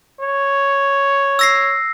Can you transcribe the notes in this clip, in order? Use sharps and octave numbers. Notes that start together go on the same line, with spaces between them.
C#5
E6 A#6 C7